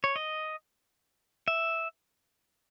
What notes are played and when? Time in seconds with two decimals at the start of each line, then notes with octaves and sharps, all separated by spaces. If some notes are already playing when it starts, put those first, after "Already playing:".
0.04 C#5
0.16 D#5
1.48 E5